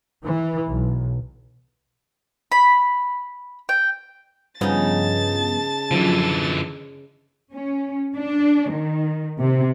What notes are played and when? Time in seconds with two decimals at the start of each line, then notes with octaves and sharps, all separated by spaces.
0.24 E3
0.69 B1
2.52 B5
3.69 G5
4.61 G2 C#3 F3 B3 D#4 A5 A6
5.91 F#2 D3 E3 F3
7.53 C#4
8.16 D4
8.71 D#3
9.40 C3